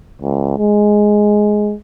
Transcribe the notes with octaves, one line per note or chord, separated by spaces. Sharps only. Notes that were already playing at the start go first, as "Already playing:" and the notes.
C#2
G#3